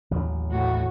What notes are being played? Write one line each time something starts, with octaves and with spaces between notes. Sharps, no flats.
A1 D#2 F#3
A2 F#4